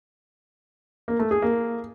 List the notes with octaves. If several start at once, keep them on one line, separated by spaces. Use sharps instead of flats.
A#3
A3
G#4
A#3